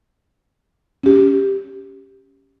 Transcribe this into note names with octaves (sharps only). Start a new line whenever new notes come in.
C#4 G4